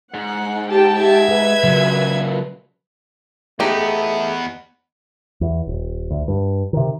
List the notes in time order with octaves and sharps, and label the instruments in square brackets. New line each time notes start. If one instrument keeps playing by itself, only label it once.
[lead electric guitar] G#2 [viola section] F#5
[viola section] G4 G5 A5
[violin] E5 G#6
[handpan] G#4 [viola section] B4
[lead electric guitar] F#2 A#2 [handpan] C#3 F#3
[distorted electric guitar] E2 B3 [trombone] A3 [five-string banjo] D#4 G4 [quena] G#4
[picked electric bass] E2
D#1
D2
G2
C3 D#3